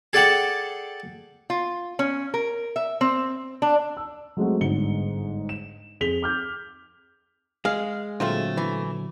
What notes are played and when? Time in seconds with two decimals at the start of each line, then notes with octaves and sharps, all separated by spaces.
0.13 G#4 A4 D5 F#5 G5 A5
1.50 F4
1.99 C#4
2.34 A#4
2.76 E5
3.01 C4
3.62 D4
3.97 E6
4.37 F#3 G#3 A3 C4 F#4
4.61 G1 G#2 C#7 G7
5.49 E7
6.00 F2 G#4 B6 F7 G7
6.22 D6 F6 G6
7.65 G#3 F5
8.20 A#2 D3 F#3 A3 C4 F4
8.57 E3